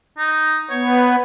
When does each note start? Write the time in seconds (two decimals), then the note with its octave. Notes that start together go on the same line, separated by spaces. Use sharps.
0.18 D#4
0.71 B3 C#5